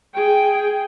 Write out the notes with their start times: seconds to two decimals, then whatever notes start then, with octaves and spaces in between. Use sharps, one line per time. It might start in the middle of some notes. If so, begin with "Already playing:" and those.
0.14 G#4 G5